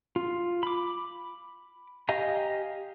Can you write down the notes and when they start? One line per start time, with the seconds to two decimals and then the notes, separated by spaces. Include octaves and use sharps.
0.16 F4
0.63 B5 D6
2.09 G4 D#5 F5 G#5 A#5